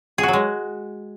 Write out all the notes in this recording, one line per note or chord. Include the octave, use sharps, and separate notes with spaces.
G#4
F#4
F#3
G#3